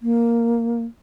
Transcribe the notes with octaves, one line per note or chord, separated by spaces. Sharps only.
A#3